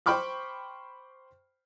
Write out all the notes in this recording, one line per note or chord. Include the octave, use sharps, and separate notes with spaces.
C5 G5 B5 C#6 D6 F6